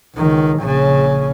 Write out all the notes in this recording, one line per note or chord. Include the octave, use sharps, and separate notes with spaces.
C#2 D#3
A#1 C#3